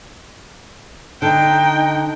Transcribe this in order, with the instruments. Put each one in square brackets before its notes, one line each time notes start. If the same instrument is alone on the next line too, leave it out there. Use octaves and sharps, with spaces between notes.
[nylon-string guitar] D3 [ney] D#4 [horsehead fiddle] G5